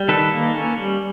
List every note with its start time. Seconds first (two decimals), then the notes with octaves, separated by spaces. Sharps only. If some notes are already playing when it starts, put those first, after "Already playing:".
Already playing: G3
0.08 D#3 A4 B4
0.31 A#3
0.54 C#4
0.78 G3